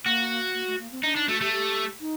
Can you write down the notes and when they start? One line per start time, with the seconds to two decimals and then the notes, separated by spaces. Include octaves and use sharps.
0.05 A#3 F#4
0.54 A#3
0.67 A3
0.79 A#3
0.92 C4
1.03 D4 D#4
1.15 D4 D#4
1.28 A3 F#4
1.40 A3 G4
1.52 G4
2.01 D#4